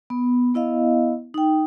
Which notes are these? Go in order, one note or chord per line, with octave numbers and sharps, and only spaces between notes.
B3
B3 E4 D#5 F5
D#4 G5